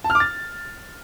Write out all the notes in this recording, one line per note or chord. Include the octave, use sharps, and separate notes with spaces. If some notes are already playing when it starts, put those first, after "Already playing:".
A5
F6
D6
A6